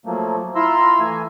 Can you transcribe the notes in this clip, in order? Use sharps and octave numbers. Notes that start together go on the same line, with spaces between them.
F3 F#3 A3 A#3
E4 F4 A#5 C6 E6
E3 A3 G#5